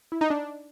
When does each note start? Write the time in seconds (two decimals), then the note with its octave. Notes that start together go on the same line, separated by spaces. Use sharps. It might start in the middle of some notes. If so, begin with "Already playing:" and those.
0.12 E4
0.21 D#4
0.30 D4